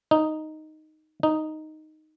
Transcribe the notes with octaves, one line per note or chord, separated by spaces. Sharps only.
D#4
D#4